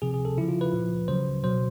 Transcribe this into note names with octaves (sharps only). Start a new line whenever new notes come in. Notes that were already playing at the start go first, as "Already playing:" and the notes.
C3 F3 G#4
G#4
A4
C#3 F3 E4
F4
B4
A#2 F3
C#3 F#3 C5
B2 F#3 C5